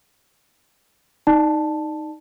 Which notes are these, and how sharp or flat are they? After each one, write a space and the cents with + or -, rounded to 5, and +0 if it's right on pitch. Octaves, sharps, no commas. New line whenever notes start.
D#4 +0 D5 +25 A5 +0